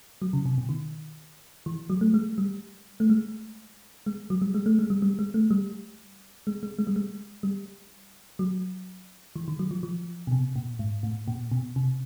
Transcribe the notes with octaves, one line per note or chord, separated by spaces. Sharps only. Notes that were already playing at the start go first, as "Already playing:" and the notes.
F#3
C#3
C3
B2
D#3
E3
F#3
A3
G#3
G3
A3
G#3
G#3
F#3
G3
G#3
A3
G#3
G3
G3
G#3
A3
G3
G#3
G#3
G#3
G3
G#3
G3
F#3
E3
D#3
F#3
F3
F3
B2
C3
A#2
G#2
A2
A#2
B2
C3